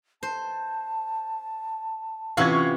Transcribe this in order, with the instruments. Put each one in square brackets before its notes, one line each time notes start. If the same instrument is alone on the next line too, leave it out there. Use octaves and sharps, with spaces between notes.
[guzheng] C5 [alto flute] A5
[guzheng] C3 E3 F#4 [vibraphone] C#4 F4 [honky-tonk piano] F5 C#6 G#6